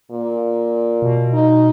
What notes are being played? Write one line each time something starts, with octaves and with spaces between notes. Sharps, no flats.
A#2
B2
D#4